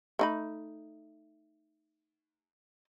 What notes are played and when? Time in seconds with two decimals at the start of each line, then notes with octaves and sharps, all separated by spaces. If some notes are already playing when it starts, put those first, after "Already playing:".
0.19 A3 D#4 B5